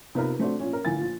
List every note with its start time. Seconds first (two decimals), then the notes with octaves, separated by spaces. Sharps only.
0.15 C3 B3 D#4 F4 A#4 B4
0.39 A3 C4 D4 F#4
0.60 A#2 C#4
0.73 A#4
0.85 G1 A2 G#5 A6
1.00 A#2 F3